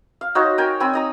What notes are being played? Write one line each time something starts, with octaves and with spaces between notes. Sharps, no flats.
F5
D#4 F#4 C5 C#5
A#4 G5 G#5
C4 G#5 B5
D#4 A#5 D#6